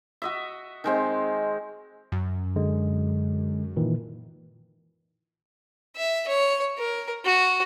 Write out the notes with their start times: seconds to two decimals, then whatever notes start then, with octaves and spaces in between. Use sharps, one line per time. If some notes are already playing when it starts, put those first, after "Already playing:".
0.22 F#4 D#5 E5
0.84 D#3 G#3 C4
2.12 F#2
2.56 D3 G#3
3.76 A#2 D#3 E3
5.96 E5
6.28 C#5
6.78 A#4
7.25 F#4